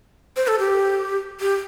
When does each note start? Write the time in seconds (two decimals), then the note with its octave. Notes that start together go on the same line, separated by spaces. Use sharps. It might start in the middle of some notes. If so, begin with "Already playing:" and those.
0.36 C5
0.47 A4
0.59 G4
1.40 G4